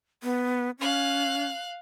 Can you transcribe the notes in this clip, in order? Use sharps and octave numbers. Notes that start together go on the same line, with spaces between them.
B3
C#4 F5 F#6